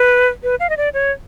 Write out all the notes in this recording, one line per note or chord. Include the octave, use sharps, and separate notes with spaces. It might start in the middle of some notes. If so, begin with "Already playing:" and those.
Already playing: B4
B4
F5
D#5
D5
C#5